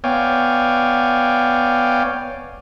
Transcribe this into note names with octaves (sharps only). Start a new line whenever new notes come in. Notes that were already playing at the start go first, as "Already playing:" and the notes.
B3 C#5 D5 F5 G5 G#5